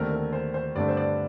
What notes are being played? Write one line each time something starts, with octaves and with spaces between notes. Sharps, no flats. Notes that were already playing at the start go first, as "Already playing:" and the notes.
Already playing: D#2 D3 A3 C4 A#4
A#4
C5
C5
G2 D3 A3 C4 D5
C5
D5